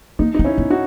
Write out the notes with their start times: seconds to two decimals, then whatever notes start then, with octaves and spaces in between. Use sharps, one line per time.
0.19 A#3 D#4
0.35 B3 D#4
0.44 C#4 E4
0.58 B3
0.70 D#4 F#4